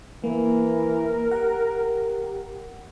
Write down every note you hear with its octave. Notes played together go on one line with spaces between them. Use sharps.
E3 A#3 A#4
G4 F#5